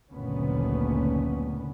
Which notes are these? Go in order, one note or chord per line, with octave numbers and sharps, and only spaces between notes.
F#1 D2 A#2 D#3 B3 C#4